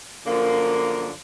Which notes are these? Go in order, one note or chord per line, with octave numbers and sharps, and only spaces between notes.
F#2 D3 F3 A#3